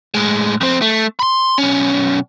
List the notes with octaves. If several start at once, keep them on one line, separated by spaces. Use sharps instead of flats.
A2 G#3
F2 C4
A3
B5 C6
B1 C#4